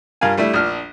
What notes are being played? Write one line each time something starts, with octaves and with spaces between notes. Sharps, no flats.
G2 F4 A#4 F5 G#5
G3 A3 D4 E4
A#1 D4 F6